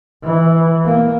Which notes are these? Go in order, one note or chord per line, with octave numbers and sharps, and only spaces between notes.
E3
A#3